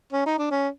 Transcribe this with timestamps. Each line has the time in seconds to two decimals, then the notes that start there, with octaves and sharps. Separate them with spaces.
0.13 C#4
0.26 D#4
0.39 D4
0.51 C#4